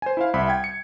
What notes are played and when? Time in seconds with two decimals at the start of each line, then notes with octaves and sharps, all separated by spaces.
0.02 C5 G#5
0.17 E4 C5 F5
0.34 C2 E5 B5
0.49 G5 G#6
0.64 C#7